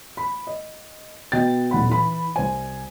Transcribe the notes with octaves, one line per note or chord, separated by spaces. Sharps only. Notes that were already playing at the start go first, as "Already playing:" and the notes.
B5
D#5
B2 D#5 G5 A6
D#1 B1 F#5 B5
E3 B5
C2 C5 G#5